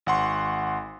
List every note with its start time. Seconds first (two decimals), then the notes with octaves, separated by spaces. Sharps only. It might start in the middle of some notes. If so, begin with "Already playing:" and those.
0.06 G#1 F#5 C6 C#6